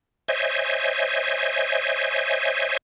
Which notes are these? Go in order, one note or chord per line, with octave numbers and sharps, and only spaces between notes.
C5 C#5 D#5 E5 G#5